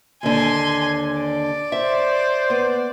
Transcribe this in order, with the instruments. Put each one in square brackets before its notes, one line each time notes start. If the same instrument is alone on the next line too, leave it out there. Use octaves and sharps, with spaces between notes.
[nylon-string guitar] D#2 D3 [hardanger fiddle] G#5 C6
[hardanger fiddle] D5
[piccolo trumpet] C5 [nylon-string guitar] E5
[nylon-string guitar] B3